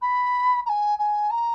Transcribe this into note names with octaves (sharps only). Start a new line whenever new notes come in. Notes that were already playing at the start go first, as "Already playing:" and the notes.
B5
A#5
G#5
G#5
A#5